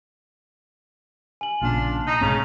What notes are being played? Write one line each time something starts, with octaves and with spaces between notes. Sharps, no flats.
G#5 F#7
A#1 A#2 C#3 D4 F4
D#4
B1 G#2 C#3 C4 A#5 F7